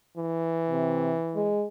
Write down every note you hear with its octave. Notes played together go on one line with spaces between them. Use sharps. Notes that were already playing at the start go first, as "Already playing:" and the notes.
E3
C3
G#3